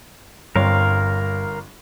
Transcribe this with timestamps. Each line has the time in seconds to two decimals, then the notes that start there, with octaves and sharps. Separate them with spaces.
0.56 G1 G2 C4 A#4 C#5 F5